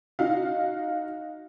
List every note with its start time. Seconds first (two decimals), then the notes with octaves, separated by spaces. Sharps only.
0.19 D#4 F#4 F5